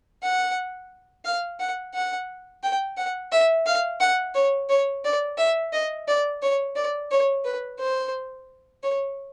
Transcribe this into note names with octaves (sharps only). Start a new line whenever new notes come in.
F#5
F5
F#5
F#5
G5
F#5
E5
F5
F#5
C#5
C#5
D5
E5
D#5
D5
C#5
D5
C#5
B4
C5
C#5